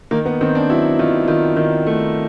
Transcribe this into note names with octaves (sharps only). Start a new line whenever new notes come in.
D#3 A#3
B3
D#3 C4
D4
F#3 E4
D#3 F4
D#3 F4
D#3
A3